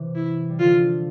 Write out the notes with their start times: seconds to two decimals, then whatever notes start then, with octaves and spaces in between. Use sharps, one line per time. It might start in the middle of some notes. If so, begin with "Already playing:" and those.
Already playing: C3 E3
0.16 E4
0.49 G3
0.59 D3 F3 F4